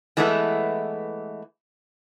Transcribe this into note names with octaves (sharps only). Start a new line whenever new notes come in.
E3 G#3 A3 B3 D4 E4